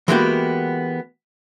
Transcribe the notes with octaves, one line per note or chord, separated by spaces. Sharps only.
E3 G#3 A#3 B3 F#4 G4